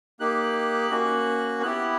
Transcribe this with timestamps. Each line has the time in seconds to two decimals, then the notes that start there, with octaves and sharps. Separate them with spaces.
0.20 A#3 D#4 G4 F#6
0.91 A#3 C#4 F#4
1.63 B3 E4 G4 F#6